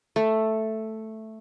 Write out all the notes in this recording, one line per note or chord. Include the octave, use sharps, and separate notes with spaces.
A3